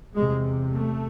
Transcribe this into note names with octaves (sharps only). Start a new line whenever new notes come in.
E2 C3 G#3
A3